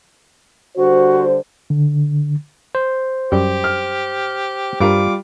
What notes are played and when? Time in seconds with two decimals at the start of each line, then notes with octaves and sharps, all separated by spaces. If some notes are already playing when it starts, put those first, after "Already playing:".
0.76 D3 G3 F#4 C5
1.70 D3
2.75 C5
3.32 F#2 G3 G4
3.64 F6
4.80 G2 G3 F4 A#4 D6